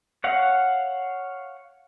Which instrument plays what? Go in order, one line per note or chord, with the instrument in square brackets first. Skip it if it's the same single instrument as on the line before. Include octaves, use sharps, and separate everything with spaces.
[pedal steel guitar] C#5 F5 F#5